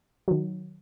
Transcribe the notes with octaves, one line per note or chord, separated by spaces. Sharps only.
D#3 F#3